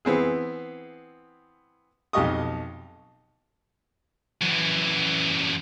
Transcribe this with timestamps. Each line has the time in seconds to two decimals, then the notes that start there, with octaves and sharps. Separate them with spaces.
0.05 E3 B3 C4 G#4
2.13 B1 F2 G4 D#5 C#6 D#6
4.42 F#2 E3